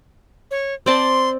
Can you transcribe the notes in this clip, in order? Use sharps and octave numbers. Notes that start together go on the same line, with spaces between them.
C#5
C4 D5 A5 C6